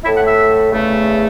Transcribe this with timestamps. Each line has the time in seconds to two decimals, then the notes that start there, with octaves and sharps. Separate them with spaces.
0.04 A2 A3 E4
0.16 F#5
0.27 E5
0.71 E2 C#3 A3